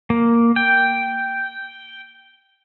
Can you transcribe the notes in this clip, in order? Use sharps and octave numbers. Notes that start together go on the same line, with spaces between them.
A#3
G5